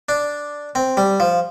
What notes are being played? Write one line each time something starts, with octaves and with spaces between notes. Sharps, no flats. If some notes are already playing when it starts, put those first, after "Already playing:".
D4
C4
G3
F3